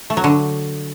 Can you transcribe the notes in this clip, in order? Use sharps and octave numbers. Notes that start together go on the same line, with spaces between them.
A3
F#3
D3